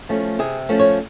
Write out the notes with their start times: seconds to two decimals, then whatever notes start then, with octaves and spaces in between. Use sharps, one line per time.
0.09 F3 A3 C#4
0.39 C3 G#4
0.69 F3 A3 C#4
0.79 C#5